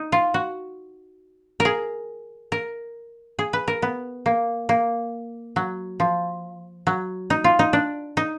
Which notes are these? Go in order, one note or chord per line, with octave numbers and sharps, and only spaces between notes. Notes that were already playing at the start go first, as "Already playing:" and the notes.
Already playing: D#4
F4
F#4
A#4
G#4
A#4
G#4
B4
A#4
B3
A#3
A#3
F#3
F3
F#3
D#4
F4
D#4
D4
D#4